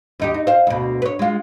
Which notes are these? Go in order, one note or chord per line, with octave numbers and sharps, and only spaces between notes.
D#2 D#4 G4
D#4
C5 F5
D2 B2
B4 C#5
G#3 F4